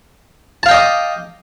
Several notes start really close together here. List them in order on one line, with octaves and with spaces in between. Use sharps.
A5 F5 G5 D#5 D6